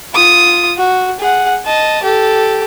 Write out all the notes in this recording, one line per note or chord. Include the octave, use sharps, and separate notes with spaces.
F4 D#6
F#4
G#4 F#5
D#5 A5
G4 A4